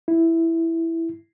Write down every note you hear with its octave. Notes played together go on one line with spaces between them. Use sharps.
E4